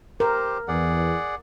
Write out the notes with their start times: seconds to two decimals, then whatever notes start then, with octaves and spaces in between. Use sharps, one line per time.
0.20 G4 A#4 C5
0.68 E2 G#4 D5 F#5